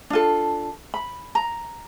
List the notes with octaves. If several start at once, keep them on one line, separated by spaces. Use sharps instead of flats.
D4 F4 A4
B5
A#5